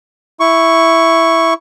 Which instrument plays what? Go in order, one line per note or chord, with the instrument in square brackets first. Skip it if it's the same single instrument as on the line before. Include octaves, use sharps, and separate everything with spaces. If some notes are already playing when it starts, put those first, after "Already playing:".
[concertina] E4 C#6